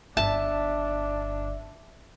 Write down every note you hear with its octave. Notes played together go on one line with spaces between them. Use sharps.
G1 D4 E5 A5